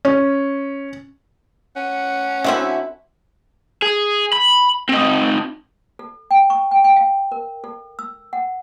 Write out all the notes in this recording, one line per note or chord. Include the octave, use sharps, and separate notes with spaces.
C#4
C#4 F#5
D3 C4 E4 F#4 E5
G#4
B5
C4 D#4
A4
G5
C#6
G5
G5
F5
A#4
A4
E6
F#5